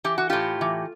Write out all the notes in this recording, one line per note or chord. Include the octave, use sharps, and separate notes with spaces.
E3 G4
F#4
A2 F4 G4
E3